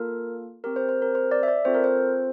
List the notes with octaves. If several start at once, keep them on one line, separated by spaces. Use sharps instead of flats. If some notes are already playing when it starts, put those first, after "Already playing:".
Already playing: A#3 F4 A4 A#4
C4 G4 A#4
C5
C5
A#4
C5
D5
E5
D5
C4 F4 A4 C5
A#4
C5